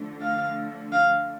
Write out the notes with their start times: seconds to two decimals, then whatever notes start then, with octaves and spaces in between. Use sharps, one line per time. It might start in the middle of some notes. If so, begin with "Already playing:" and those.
Already playing: D3 F3 A3
0.22 F5
0.92 F5